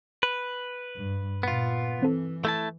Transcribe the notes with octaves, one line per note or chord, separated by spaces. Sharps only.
B4
G2
A#2 B3 F4
E3 C4 A4
A3 E4 A5